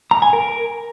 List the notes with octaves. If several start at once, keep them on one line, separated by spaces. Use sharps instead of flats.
A#5
G#5
A#4